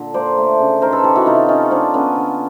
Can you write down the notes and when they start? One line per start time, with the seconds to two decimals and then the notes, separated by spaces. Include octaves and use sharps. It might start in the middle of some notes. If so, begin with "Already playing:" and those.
Already playing: A#2 D3
0.14 A#3 C5 D5
0.38 A3
0.60 C#3
0.82 D#3 A#4 C5
0.92 A4 B4
1.04 D#3 G4 A4
1.16 E4 F#4
1.26 C3 D#4 F4
1.48 F3 C#4 D#4
1.71 A#3 C4 D4
1.94 D3 B3 C#4
2.16 D3